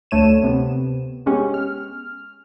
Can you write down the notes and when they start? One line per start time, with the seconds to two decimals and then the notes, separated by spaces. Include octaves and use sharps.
0.11 D2 D3 A3 C#5 D#7 E7
0.43 C3 B3 C4
1.26 G#3 B3 C#4 G4
1.54 F6